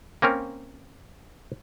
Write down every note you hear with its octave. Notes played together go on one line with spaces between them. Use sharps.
A#3 C4 C#4 A#4